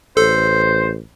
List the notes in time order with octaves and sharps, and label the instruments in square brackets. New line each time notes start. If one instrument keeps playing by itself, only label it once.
[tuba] A1 [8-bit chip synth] A4 [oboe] C5